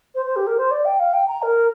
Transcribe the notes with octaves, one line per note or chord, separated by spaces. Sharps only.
C5
C5
G4
A#4
C5
D5
G5
F5
G5
A#5
A#4